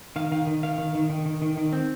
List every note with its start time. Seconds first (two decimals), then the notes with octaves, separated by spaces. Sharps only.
0.16 D#3 F5
0.32 D#3 F5
0.47 D#3
0.63 D#3 F5
0.78 D#3
0.95 D#3
1.10 D#3
1.26 D#3
1.42 D#3
1.57 D#3
1.73 C4